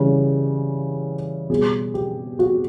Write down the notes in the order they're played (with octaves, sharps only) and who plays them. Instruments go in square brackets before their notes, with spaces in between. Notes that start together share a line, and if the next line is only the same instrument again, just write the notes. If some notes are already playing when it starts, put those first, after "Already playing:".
Already playing: [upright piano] C#3 E3 G3
B2 G3 G#4
G4
F#4